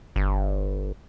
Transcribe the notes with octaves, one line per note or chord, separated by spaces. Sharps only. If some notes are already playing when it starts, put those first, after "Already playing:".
G1